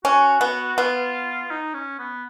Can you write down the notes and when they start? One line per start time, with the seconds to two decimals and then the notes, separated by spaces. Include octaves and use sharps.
0.05 C#4 F#4
0.41 B3
0.77 B3 F4
1.50 D#4
1.74 C#4
1.99 B3